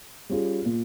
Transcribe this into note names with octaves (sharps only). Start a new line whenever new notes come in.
G3 C#4 F4 G#4
A#2